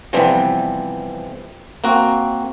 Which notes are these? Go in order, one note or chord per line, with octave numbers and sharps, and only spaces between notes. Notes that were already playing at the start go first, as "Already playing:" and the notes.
C3 E3 F3 G3 B3 C4
A#3 C4 F#4